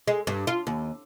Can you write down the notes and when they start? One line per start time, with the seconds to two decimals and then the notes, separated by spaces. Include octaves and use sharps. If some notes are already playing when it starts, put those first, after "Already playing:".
0.08 G#3
0.27 G2
0.47 F4
0.67 D#2